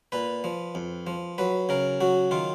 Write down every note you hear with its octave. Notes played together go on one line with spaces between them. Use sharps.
A#2 B4
F3
F2
F3
F#3 B4
C#3 A#4
F#3 F#4
D#3 F4